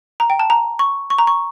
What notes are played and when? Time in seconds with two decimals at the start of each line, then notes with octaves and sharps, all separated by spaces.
0.20 A#5
0.30 G5
0.39 A5
0.50 A#5
0.79 C#6
1.10 C#6
1.18 A#5
1.27 C#6